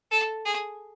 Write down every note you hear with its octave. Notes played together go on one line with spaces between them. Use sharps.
A4
G#4